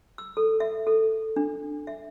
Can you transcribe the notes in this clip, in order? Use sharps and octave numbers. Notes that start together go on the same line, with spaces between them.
E6
A4
E5
A4
D4
E5